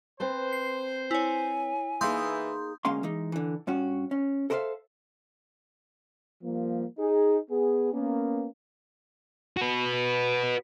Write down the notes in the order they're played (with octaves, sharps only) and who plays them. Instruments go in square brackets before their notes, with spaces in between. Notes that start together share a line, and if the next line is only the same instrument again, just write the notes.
[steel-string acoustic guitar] C4 B4 A5 [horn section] C5
[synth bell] C7
[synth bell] E4 C#5 [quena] G#5
[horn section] E3 [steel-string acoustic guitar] A#3 D#4 G#4 [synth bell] C6 D#6 G6
[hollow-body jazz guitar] D2 G#3 A#3 C#4 F5 C6
E3 G#3 D#4
D3 E3
G2 C#4 F#4
C#4
A4 A#4 C5 D5 E5 F5
[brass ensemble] F3 G3 A#3
D#4 G#4
B3 G#4
A#3 B3 C#4
[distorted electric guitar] F#4 B4